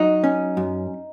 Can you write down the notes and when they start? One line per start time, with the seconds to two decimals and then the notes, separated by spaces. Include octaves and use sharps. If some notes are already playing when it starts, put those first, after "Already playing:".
Already playing: F#3 D#4
0.24 C#4
0.57 F#2